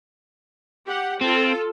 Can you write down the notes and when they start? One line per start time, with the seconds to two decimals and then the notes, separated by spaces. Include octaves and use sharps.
0.87 G4 F#5
1.21 C4 F4 A4